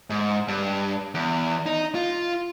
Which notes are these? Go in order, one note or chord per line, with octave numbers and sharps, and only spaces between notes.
G#2
G2
E2
D#4
F4